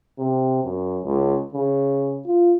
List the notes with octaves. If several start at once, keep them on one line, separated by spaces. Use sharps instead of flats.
C3
F#2
C#2
C#3
F4